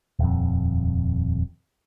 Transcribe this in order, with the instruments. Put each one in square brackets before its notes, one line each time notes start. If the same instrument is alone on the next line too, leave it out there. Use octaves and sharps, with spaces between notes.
[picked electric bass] D#1 F2